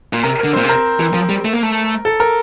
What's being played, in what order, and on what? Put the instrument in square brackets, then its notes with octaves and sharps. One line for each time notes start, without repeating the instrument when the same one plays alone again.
[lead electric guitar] A#2
[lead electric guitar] C3 [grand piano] A#4
[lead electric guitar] D3 [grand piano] A#4
[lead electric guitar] A#2 [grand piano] C4 C5
[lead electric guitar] C3
[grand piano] A#4
[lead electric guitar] E3
F3
G3
A3
A#3
A3
[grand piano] A4
A#4